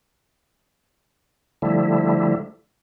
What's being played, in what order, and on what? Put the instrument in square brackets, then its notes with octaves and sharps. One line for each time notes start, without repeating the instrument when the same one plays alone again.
[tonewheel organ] D3 F3 G3 A3 E4